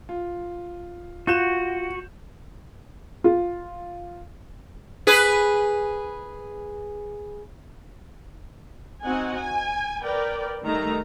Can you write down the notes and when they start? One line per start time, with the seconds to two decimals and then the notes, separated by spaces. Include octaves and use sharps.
0.09 F4
1.27 F4 F#4 F#6 G6 E7
3.24 F4
5.07 G#4 B4
9.04 C4 D#4 F#4 F#5 G#5
9.35 G#5
10.03 A#4 B4 D5 G5
10.65 D#3 G3 A3 D#4 A#5